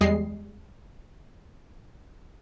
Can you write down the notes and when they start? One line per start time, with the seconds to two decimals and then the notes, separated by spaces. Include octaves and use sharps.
0.01 E2 G3 G#3 D#5 C7